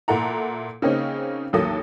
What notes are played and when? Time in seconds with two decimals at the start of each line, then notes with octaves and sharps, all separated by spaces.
0.08 A#2 E4 A4 F#5 A#5
0.82 C#3 A#3 C4 C#4 D#4
1.53 A1 D#2 F#3 A#3 A4 D#6